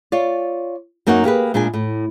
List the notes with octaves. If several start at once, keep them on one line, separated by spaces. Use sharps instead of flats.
F4 C#5 D5
F#2 A#3 D#4 F#4 C#5 F#5
A#3 G4 G#4 B4
A#2 G#3 D4 G#4 D5 G#5
A2